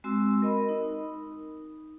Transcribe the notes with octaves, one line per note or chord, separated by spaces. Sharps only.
G#3 C4 F#4 G#5 C6 E6
A#4 D#5 B5
D#4